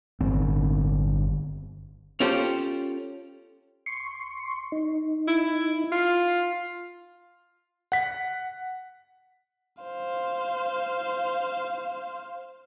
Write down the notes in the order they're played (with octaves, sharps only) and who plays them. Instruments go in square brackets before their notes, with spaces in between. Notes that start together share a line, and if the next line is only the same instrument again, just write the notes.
[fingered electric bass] G1 C4
[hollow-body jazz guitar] C#4 F4 G4 A4 C5
[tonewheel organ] C6 C#6
D#4
[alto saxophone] E4
F4
[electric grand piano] F#5 B6
[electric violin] C5 F5